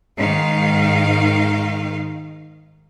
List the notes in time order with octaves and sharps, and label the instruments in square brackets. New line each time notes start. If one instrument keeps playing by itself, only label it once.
[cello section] G#2 D#3 F5